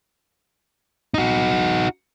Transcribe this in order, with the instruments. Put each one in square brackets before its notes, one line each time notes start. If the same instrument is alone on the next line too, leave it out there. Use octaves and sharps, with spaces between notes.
[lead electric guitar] D#4 F#4